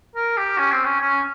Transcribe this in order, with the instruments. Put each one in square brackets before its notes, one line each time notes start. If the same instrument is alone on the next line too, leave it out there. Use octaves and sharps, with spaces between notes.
[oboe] A#4
G4
C#4
C4
C#4
C#4